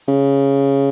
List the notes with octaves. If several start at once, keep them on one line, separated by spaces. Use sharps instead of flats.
C#3